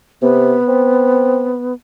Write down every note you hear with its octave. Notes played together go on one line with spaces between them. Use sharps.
C3 B3
C4